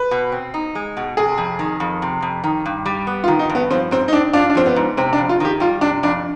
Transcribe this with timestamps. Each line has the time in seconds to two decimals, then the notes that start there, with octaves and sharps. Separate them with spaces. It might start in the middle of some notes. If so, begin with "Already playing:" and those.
Already playing: B4
0.11 B2
0.32 C4
0.54 D#4
0.75 G#3
0.97 B2
1.17 C3 G#4
1.38 F2
1.59 D#3
1.80 F2
2.02 C3
2.22 F2
2.44 D#3
2.65 G2
2.86 G3
3.07 B3
3.24 F4
3.28 D#3
3.39 D#4
3.49 G2
3.55 B3
3.71 F3 C4
3.91 G#2 C4
4.08 D#4
4.13 C4 D4
4.33 D4 F4
4.50 D4
4.55 F3 C4
4.66 B3
4.76 G#2
4.97 C3 C4
5.13 D4
5.18 F2
5.29 F4
5.40 D#3 G4
5.60 G3 F4
5.81 C3 D4
6.03 F2 D4